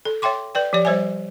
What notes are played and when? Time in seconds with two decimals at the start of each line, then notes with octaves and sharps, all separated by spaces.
0.05 A4
0.22 C#5 E5 G5 C6 D6
0.55 B4 D5 G5
0.73 F3 G4 D5
0.85 G3 C5 C#5 E5 G#5